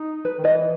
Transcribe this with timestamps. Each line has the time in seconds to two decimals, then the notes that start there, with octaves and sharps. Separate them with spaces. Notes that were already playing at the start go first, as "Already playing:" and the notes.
Already playing: D#4
0.25 B4
0.39 D#3
0.44 E3 B4 D#5